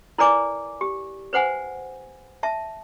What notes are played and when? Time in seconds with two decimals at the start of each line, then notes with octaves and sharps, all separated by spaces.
0.18 E4 A#4 B4 D5 G#5 D6
0.81 G4
1.33 B4 C5 F#5 G#5
2.43 E5 A5